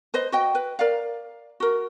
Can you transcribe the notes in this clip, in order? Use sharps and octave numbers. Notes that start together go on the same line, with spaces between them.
B4 C5 D#5
F#4 D#5 G5
B4
A#4 D5 F5
F#4 A#4